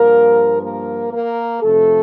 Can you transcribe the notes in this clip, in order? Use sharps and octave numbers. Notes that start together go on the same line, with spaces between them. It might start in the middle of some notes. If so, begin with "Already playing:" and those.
Already playing: G2 F3 A#3 A#4
A#3 A#4
A#3 A#4
F2 C3 F3 A3 A4